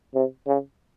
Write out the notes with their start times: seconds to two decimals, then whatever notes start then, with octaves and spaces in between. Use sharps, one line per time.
0.15 C3
0.47 C#3